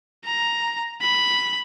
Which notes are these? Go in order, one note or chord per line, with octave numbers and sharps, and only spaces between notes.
A#5
B5